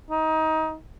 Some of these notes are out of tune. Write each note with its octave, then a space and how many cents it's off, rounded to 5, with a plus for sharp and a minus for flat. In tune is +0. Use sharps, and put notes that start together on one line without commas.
D#4 +25